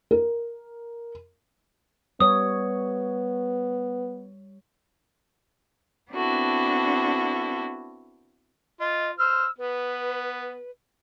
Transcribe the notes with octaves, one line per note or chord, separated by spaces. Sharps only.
A#4
G3 B3 C#5 D#6
B3 C4 D4 E4 F#4 A4
F4 D#5
C5 E6 F6
B3 B4